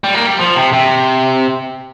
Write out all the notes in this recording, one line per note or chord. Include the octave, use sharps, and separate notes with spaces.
G3
A#3
G3
F3
C3
C3